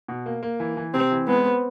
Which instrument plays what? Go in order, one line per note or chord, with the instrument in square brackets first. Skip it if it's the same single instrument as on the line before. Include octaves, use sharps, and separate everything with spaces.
[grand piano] B2
A#3
A#3
E3
E3
[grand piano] C3 [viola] C4
[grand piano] E3
[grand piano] G#3 [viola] B3
[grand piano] C4